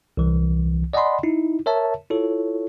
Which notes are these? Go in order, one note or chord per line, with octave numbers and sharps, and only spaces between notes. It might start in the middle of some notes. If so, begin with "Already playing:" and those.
C2 E3
D5 D#5 F#5 G#5 B5 C6
D#4 E4
A#4 C#5 E5 A5
E4 F4 A4 C#5